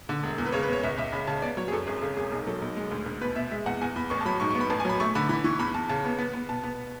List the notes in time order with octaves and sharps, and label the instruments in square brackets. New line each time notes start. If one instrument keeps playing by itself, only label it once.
[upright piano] D3
E1
E2
B4
C#3 C#5
B4
E2 C#5
C#2 E5
C#2 E5
C#3 B5
C#3 A5
B3 D5
F#3 C#5
G#4
F#2 A4
G#1 G#4
C#3 A4
E1 G#4
B1 G#4
F#3 A4
B1
G#3
D2
D2
B2 B4
B2 E5
G#3 E5
E2 F#5
E2 G#5
E2 B5
A1 C#6
A5
F#3 B5
G#2 C#6
C#6
B3
B5
A1 A5
G#5
F#3 B5
A3 C#6
D3 B5
E3 B5
E3 C#6
E2 B5
E2 A5
C#3 A5
B3
B3
B3
B2 A5
B3